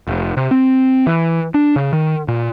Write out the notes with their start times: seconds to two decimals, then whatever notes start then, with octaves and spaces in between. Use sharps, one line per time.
0.07 F1
0.37 C3
0.51 C4
1.07 E3
1.54 D4
1.76 C#3
1.93 D#3
2.28 A#2